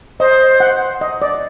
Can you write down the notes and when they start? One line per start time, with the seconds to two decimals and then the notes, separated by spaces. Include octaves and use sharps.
0.20 C5 D#5
0.60 F#5
1.01 D#5
1.22 D5